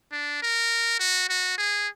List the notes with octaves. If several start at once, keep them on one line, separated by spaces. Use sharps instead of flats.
D4
A#4
F#4
F#4
G#4